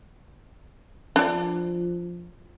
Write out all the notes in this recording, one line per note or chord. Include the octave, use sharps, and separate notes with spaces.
F3 D4 D5